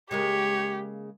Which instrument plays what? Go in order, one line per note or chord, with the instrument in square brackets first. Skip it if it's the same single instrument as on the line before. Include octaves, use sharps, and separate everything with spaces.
[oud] C#3 G#3 A#3 [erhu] G4 [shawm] C#5